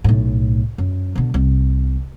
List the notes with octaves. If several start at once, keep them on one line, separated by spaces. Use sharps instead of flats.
B1 A2
F#2
B2 D3
C2